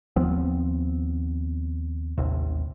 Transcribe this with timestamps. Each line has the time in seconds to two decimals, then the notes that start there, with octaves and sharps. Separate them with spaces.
0.16 D#2 F3 B3 C4
2.18 A1 D#2 C3